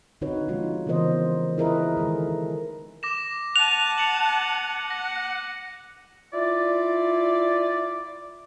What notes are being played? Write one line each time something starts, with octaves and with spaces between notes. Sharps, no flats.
D3 C4 D#4 F#4 B4 C#5
F3 G#3 D#4 F4
C#3 E3 B3 A#4 C5 D#5
E4 G#4 A#4 B4 D#5 E5
D#3 G#3 G#4 A4
D6 A#6 E7
F#5 A5 F#6 D#7 F7
C#7 F#7
F#5 A#6
E4 F4 D5